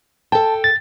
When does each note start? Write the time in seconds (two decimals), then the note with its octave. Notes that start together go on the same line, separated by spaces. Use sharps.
0.32 A4 G5 A5
0.64 A6